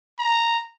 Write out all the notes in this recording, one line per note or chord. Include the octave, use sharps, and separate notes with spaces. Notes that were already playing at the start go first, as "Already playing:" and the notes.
A#5